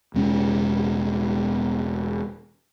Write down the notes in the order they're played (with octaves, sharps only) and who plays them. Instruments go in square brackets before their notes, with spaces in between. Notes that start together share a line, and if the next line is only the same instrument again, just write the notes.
[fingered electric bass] E1 G#3 C#4